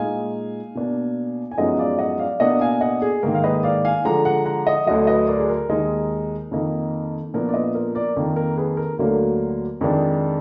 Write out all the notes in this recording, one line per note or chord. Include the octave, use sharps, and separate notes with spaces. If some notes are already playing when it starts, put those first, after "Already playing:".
Already playing: A#2 G#3 D#4 F5 G#5
B2 A#3 D4
G#5
F#2 F3 G#3 B3 D#4 D#5 F#5
D5 F5
D#5 F#5
D5 F5
B2 A#3 D4 D#5 F#5
F5 G#5
D#5 F#5
G#4
G#2 D#3 A#3 A#4
F5
B4 D#5
D5 F5
F5 G#5
D3 F3 G#3 F#5 A#5
F#5 A#5
F#5 A#5
D#5 F#5
D2 D3 F#3 D#5 F#5
B4 D#5
A#4 D5
G#4
A#4
D#2 D#3 G#3 D#4
F2 D#3 A#3 D#4
A#2 F3 B3 D4 A#4 D5
D5
B4 D#5
A#4
A#4 D5
F2 D#3 A#3 A#4
A#4
G#4 B4
A#4
D2 D3 F#3 A#3 D4 A#4
F2 D#3 G#3 D4